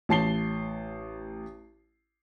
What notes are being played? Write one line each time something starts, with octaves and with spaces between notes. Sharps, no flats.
A1 A5 C7 G7